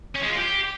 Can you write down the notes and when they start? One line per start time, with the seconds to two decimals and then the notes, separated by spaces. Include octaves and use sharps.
0.15 C#4
0.22 G#3
0.30 F4
0.37 G4